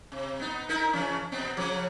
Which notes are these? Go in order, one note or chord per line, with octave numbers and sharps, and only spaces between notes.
C3
B3 D#4
D#4 E4 A#4
C#3 E3 C#4
B2 B3 C4
C#3 F3